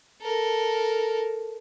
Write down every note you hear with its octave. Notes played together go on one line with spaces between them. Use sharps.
A4 A#4